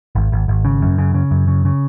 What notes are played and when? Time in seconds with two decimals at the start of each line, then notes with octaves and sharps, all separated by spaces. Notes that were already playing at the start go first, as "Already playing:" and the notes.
0.15 G#1
0.32 G#1
0.48 G#1
0.65 C#3
0.82 F#2
0.98 C#3
1.14 C#3
1.31 F#2
1.47 C#3
1.65 C#3